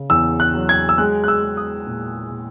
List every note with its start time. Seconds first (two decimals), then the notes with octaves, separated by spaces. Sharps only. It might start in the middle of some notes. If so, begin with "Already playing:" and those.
Already playing: C#3
0.10 E2 E6
0.40 F#6
0.54 F#3
0.69 G#6
0.89 E6
0.98 G#3 F#6
1.24 F#6
1.28 E6
1.43 G#3
1.57 D#6
1.86 A#2
2.31 A#2